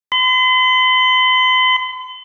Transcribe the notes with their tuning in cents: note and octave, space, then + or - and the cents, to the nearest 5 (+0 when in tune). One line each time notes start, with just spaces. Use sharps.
C6 -45